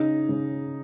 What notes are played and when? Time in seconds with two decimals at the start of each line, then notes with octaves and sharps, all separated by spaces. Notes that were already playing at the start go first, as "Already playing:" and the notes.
Already playing: C#3 D#4
0.29 C#3